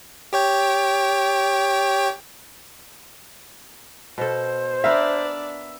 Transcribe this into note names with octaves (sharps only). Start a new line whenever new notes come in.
G4 C#5 G5
B2 A4 C5
B3 D4 A#4 D5 E5 F5